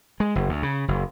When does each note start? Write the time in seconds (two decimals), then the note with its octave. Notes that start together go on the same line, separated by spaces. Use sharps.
0.20 G#3
0.35 F#1
0.49 D2
0.63 C#3
0.88 F#1